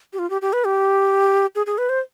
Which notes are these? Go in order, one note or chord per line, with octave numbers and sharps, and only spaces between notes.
G4
F4
G4
G4
B4
G4
G#4
G#4
B4
C5